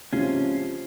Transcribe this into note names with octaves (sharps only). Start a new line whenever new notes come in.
C3 F3 G#3 C#4 F4